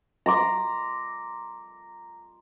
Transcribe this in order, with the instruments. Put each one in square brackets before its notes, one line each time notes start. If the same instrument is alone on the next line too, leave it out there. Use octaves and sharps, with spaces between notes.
[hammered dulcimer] A#5 C6 D6